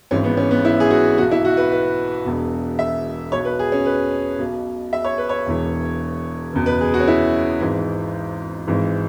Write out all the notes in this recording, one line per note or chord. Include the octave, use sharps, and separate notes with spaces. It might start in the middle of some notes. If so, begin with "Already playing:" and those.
G#1 G#2 E3 C#4
B3
C#4
B3
E4
G#4
F#4
B1 B2 F#4
E4
F#4
B4
B4
E1 E2 B2
E5
B1 B2 C#5
B4
G#4
C#4
B4
B1 B2
E5
C#5
B4
C#5
E1 E2 E3
F#1 E2 B2
B4
G#4
F#4
C#4
E4
G#1 G#2 E3
G#1 G#2 E3